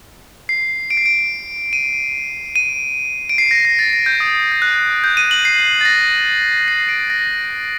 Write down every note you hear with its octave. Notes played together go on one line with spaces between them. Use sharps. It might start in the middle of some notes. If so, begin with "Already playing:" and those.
C7
D7
C7
D7
D#7
D#7
D7
C7
A#6
A#6
A6
A#6
G6
D#6
G6
F#6
G6
D#7
F#7
C7
A6
A#6
C7
D7
A#6